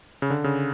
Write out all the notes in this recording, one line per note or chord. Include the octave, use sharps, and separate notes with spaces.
C#3
D3
C#3